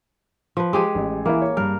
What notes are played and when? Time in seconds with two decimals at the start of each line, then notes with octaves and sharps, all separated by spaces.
0.57 F3 B4
0.73 G#3 G4 G#4
0.95 A1
1.26 E3 A#3 E4
1.42 C#5
1.57 G2 A#4